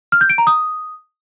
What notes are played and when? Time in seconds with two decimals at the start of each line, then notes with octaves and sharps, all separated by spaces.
0.12 F6
0.21 G6
0.30 D7
0.38 A#5
0.47 D#6